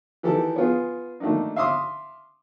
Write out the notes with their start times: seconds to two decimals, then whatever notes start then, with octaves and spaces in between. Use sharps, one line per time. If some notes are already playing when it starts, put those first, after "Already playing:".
0.23 D#3 E3 G4 A4
0.56 B3 F4 G#4
1.20 D#3 A3 A#3 D4 D#4
1.56 E5 F5 C6 D6 D#6